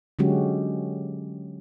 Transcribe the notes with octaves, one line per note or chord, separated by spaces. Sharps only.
D3 F#3 G#3 C#4 F#4 G4